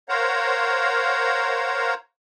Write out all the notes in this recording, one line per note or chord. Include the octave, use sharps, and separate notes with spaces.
A#4 C5 C#5 F5 F#5 A#5